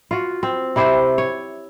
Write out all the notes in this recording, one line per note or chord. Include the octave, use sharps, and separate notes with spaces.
F4 F#4
C4
C3 E4 G4 C5
C#5